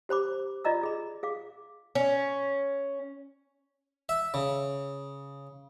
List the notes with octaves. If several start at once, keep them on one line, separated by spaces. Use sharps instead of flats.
G4 C5 B5 D6
F4 D5 D#5 A#5 E6
F4 G#4 B5
G#4 F5 D6
C#4
E5
C#3